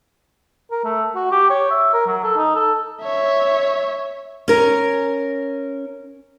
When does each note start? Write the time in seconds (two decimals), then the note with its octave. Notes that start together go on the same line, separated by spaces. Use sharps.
0.71 A#4
0.85 A3
1.15 F#4
1.32 G4
1.50 C#5
1.71 E5
1.93 A#4
2.07 F#3
2.24 A4
2.36 D#4
2.55 A4
3.02 C#5 E5
4.48 C#4 A#4